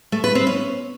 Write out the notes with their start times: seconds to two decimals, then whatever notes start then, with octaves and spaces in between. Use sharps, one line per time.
0.12 A3
0.24 B4
0.35 C4
0.47 C#4